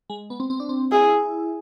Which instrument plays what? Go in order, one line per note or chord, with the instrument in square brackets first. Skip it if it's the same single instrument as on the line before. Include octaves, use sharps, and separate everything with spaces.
[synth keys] G#3
B3
C4
C4
D4
C4
[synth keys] E4 [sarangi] G#4